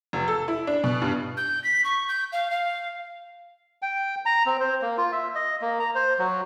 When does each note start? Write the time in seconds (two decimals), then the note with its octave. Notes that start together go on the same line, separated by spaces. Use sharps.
0.13 F1
0.28 A4
0.48 E4
0.67 D4
0.84 B2
1.02 G2
1.37 G6
1.64 B6
1.84 C#6
2.09 G6
2.32 F5
2.51 F5
3.82 G5
4.26 A#5
4.46 C4
4.60 C5
4.82 A#3
4.98 F4
5.12 E5
5.35 D#5
5.61 A#3
5.80 A#5
5.95 C5
6.19 F#3